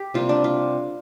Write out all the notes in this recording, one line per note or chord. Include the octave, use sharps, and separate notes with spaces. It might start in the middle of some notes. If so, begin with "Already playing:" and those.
Already playing: G4
C3 G3 A#3 F4
D4
F4